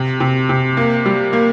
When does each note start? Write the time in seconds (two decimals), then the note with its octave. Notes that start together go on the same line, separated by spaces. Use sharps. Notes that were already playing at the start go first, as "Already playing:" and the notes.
Already playing: C3
0.20 C3
0.49 C3
0.77 A#3
1.06 G3
1.33 A#3